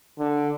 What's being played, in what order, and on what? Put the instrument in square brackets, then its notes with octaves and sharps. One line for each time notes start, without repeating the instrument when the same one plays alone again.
[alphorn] D3